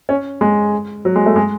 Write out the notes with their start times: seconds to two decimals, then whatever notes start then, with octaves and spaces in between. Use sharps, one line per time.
0.09 C#4
0.41 G#3
1.05 F#3
1.16 G#3
1.26 A3
1.36 G#3